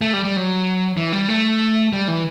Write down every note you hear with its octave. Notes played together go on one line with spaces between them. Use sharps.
A3
G3
G3
F#3
E3
G3
A3
G3
E3